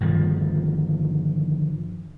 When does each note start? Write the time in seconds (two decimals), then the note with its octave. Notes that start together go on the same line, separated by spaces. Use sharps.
0.01 G1 G2 D#3 F3